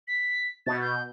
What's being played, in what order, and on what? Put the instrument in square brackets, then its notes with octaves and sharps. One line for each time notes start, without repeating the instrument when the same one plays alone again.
[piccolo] B6
[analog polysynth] B2 [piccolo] A6
[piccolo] G6